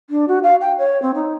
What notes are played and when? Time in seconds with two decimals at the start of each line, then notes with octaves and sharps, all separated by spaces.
0.10 D4
0.28 F#4
0.43 F5
0.61 G5
0.79 C#5
1.02 C4
1.15 D#4